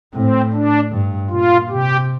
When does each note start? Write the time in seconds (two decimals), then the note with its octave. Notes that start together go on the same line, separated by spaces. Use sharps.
0.14 A2 C4
0.53 D4
0.91 G2
1.30 A#2 F4
1.69 C3 G4